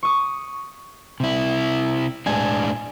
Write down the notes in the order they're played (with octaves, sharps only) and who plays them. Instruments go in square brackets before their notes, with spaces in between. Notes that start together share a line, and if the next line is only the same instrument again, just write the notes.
[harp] C#6 D#6
[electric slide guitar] C3 E4
[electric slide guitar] A2 G#3 D4 [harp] G#5